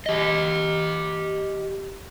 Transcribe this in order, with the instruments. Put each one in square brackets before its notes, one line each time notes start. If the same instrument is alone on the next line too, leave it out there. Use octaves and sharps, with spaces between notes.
[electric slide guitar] G4 D#5